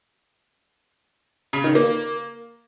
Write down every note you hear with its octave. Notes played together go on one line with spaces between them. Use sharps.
C#3
D#3
A#3